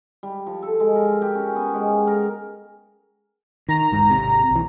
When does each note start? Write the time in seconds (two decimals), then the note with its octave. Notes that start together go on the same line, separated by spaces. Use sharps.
0.23 G3
0.46 F3
0.63 A4
0.80 G#3
0.96 A#4
1.22 G4
1.35 C#4
1.56 B3
1.74 G#3
2.07 A#4
3.69 D#3 A#5
3.92 E1 G#2
4.10 G#1 C3
4.51 B1 E3